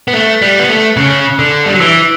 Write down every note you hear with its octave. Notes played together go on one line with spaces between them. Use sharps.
B3
A3 F#6 C#7 G7
G3
B3
A3
C#3 F#6 C#7 G7
D3
G3
F#3
E3 E6 B6 D7 G7